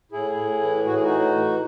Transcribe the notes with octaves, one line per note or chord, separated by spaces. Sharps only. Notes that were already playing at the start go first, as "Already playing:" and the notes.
A2 E4 G#4
A2
E3
A2 F#4
G#4
D#4 F#4
A2
E3